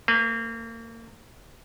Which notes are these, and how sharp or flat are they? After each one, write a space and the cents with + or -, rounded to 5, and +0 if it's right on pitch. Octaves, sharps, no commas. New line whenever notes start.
A#3 -35 B4 +15